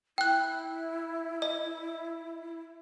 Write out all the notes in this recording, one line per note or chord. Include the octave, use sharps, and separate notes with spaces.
E4 G5 F#6
D#5